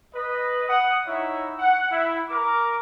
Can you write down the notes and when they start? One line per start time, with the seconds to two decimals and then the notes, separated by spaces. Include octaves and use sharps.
0.14 B4 D#5
0.68 F#5 D#6
1.06 D#4 E4 C#5 E5 F#5
1.59 F#5
1.90 E4
2.29 A#4 D6